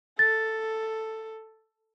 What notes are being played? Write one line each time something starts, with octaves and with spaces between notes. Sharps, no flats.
A4 A6